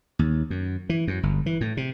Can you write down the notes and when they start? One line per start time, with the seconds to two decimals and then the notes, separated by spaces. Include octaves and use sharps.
0.19 D#2
0.50 F#2
0.89 E3
1.08 F#2
1.23 G1
1.46 E3
1.61 A2
1.77 C3